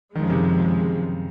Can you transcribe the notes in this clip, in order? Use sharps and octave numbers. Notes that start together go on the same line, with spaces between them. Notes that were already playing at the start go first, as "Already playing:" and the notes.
F#2 D#3 F3 G#3
C#3
C3 D#3